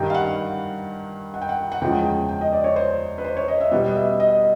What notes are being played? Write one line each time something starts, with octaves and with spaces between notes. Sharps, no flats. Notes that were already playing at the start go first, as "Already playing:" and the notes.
Already playing: G2 D#3 G3 G5
F5
F#5
F#5
G5
F#5
F#5
E2 C#3 F3 G#3 G5
G5
G5
D#5
D5
C#5
C5
B4
C5
C#5
D#5
E5
B2 G3 B3 F#5
D#5
E5
D#5